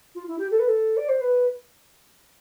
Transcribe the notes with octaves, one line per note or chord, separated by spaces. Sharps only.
F4
E4
G4
A4
B4
A4
D5
C5
B4